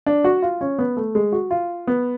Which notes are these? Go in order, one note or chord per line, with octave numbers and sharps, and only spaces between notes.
D4
F#4
F4
C#4
B3
A3
G#3
F#4
F4
B3